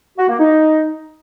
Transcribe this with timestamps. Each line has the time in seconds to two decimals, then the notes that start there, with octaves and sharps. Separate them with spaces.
0.18 F#4
0.29 A#3
0.39 D#4